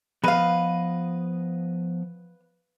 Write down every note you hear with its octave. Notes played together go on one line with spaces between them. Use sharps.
F3 B3 B4 D#5 F5